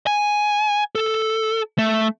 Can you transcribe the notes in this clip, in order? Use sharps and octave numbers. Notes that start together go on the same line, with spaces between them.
G#5
A4
A3